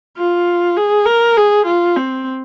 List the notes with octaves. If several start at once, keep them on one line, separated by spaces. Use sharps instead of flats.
F4
G#4
A#4
G#4
F4
C4